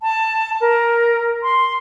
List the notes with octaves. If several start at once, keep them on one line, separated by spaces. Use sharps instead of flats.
A5
A#4
C6